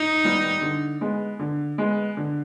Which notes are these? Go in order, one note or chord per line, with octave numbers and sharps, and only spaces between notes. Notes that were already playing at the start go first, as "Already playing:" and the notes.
Already playing: D#4
D#3 G3 B3
D3
G#3 B3
D3
G#3 B3
D3